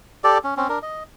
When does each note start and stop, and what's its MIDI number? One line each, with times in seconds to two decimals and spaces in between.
0.24 0.38 67
0.24 0.38 69
0.24 0.38 74
0.44 0.54 61
0.57 0.68 60
0.57 0.68 61
0.69 0.79 62
0.69 0.79 70
0.82 1.03 75